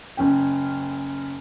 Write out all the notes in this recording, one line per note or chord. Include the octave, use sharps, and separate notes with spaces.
F#1 C#4 G5